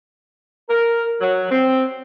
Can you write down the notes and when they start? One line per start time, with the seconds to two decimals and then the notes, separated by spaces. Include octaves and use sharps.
0.70 A#4
1.20 F#3
1.50 C4